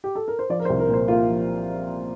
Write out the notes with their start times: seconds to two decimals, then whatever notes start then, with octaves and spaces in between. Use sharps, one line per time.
0.04 G4
0.15 A4
0.28 A#4
0.39 C5
0.49 F3 D5
0.60 A#4
0.65 C5
0.70 C2
0.80 A#4
0.89 A#2 C5
1.08 A#3 F4
1.28 F3